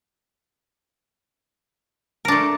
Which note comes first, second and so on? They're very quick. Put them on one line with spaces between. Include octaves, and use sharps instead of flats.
A#4 D4 A3